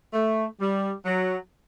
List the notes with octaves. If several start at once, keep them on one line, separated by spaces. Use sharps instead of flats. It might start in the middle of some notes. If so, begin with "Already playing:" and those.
A3
G3
F#3